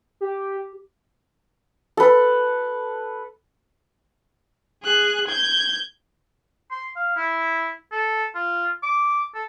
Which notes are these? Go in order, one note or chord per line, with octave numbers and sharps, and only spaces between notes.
G4
A4 B4
G#4 F#6
G6 G#6
C6
F5
E4
A4
F4
D6
A4